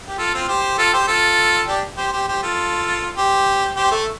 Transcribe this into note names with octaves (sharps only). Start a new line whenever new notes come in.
G4
F4 A4
C4 F4
G4 C5
F4 A4
G4 C5
F4 A4
D4 G4
G4 C5
G4 C5
G4 C5
F4 A4
G4 C5
G4 C5
A3